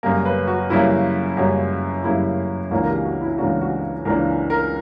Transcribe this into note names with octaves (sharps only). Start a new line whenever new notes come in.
F#2 C#3 G3 A#3 A#4
B4
F#4
F#2 C#3 G3 A#3 E4
F#2 C#3 G3 A#3 F#4
F#2 C#3 G3 A#3 E4
C#2 C#3 E3 A#3 D4 F#4
A#4
G4
F#4
E4
C#2 C#3 E3 A#3 D4 F#4
F#4
C#2 C#3 E3 A#3 D4 A#4
A#4